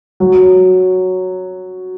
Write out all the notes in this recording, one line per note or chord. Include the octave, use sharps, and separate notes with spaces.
F#3